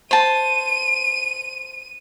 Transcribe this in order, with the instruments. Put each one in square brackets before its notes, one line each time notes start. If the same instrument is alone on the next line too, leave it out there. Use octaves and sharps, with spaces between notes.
[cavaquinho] C5 A5 [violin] D#7